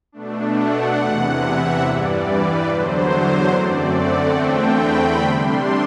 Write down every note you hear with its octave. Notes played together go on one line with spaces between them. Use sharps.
B2 A3 D4
F#5
E2 C3 E3
E5
G2 E3 G3 D5
B4
E2 D3 F#3 C5
C5
F#2 D3 A3 C4 D5
F#5
E2 D3 A3 C4 G5
B5
C3 G3 D4 C6